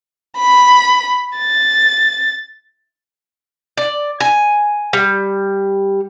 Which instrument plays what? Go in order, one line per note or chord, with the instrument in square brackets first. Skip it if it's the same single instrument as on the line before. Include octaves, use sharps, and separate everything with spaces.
[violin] B5
A6
[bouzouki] D5
G#5
G3